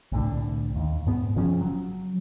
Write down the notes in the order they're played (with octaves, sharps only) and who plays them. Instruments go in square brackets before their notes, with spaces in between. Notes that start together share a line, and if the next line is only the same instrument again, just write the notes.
[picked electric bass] C2 A2 D3
D#2
G#2 B3
F#1 C#3 F3 C#4
F#3